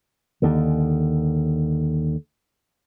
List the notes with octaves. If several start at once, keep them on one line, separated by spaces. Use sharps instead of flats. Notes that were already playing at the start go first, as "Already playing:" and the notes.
D#2 D3